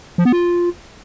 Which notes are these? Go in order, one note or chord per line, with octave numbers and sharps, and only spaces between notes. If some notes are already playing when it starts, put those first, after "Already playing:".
F3
B3
F4